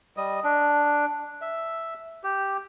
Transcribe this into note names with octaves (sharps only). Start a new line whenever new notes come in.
G3 D#5
D4
E5
G4